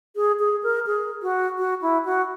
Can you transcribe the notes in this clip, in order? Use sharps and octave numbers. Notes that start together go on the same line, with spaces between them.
G#4
G#4
A#4
G#4
F#4
F#4
E4
F#4